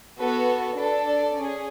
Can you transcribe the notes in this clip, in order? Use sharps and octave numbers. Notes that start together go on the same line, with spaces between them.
B3 F#4 A4 B4
D4 A4 B4
D5
C#4 G#4